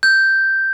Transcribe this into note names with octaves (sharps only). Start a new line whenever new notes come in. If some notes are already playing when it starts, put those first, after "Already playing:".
G6